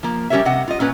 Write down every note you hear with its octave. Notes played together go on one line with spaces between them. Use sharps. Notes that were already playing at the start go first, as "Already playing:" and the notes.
F3 A#3
G3 C#4 G4 A#4 C#5 E5
C3 D#5 F#5
F4 D#5
A#2 C#4 B4